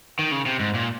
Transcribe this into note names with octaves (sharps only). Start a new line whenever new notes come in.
D#3
C#3
C3
G#2
A#2